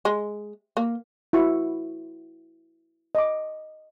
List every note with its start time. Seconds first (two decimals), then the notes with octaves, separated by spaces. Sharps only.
0.05 G#3
0.77 A#3
1.33 E4 F#4 C#6
3.15 D#5 D6